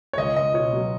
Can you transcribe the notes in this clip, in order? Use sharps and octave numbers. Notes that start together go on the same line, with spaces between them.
C#5
C#2 D#5
C#2 D#5
B2 C#5
F#3